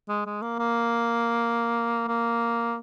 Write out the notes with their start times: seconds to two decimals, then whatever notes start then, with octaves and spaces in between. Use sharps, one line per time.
0.09 G#3
0.26 G#3
0.42 A#3
0.59 A#3
2.08 A#3